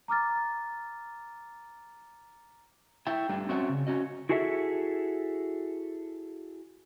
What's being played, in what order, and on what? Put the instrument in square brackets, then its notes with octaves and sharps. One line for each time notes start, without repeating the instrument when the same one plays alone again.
[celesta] A#5 D6 F6 A6
[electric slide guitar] E4 E5 G5
G3 A3 D4
C4 C#4 F#4 D5 E5 F#5
C#3
C#4 F#4 D#5
E4 F#4 G#4 A4 D#5 E5